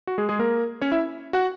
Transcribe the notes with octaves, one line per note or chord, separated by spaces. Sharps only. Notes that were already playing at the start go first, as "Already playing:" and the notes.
F#4
G#3 G#4
G#3 G#4
A#3 A#4
C#4 C#5
E4 E5
F#4 F#5